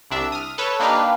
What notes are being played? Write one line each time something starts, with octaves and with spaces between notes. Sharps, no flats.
C2 D4 E5
D#6 F6
A4 B4 C#5
A#3 D4 D#4 G4 B4 F5